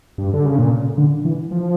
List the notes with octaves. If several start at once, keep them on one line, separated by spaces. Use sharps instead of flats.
G2
D3
C#3
A#2
D3
E3
F3